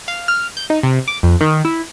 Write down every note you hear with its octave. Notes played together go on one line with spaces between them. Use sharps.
F5
F6
G6
D#4
C3
D6
F2
D#3
E4